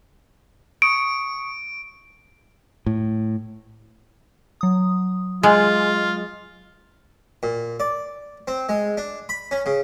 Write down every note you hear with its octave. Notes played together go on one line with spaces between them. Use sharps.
C#6 D#6 C#7 D7
A2
F#3 D#6
G#3 F4
A#2
D5
C4
G#3
D4
B5
C#4
C#3